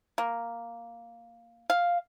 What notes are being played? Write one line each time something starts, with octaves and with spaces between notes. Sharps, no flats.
A#3
F5